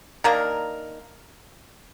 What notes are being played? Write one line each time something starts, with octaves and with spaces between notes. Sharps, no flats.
D#3 A#3 D4 A#4